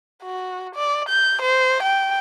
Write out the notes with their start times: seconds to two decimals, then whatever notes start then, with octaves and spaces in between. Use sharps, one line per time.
0.23 F#4
0.75 D5
1.09 G6
1.42 C5
1.83 G5